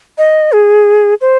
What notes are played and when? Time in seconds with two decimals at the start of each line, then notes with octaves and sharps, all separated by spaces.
0.18 D#5
0.52 G#4
1.21 C5